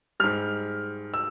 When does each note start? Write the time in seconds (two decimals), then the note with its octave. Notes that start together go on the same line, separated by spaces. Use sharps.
0.20 G#2 G3 F6
1.14 E6